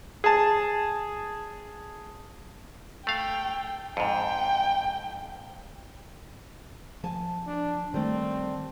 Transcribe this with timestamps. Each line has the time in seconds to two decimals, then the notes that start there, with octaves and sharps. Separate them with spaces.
0.24 G#4 A5
3.07 A3 F5 G5
3.97 F2 G#2 G5
7.04 F3 G#5 A5
7.47 D4
7.94 D#3 G3 A3 C4